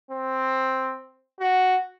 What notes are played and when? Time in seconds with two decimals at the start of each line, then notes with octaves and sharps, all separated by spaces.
0.11 C4
1.40 F#4